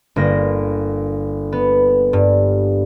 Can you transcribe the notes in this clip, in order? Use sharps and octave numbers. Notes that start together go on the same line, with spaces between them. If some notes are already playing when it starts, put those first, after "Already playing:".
G1 A#3 A#6
B3
G2